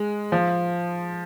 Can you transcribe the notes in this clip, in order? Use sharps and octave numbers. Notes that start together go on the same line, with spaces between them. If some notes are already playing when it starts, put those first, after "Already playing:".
Already playing: G#3
F3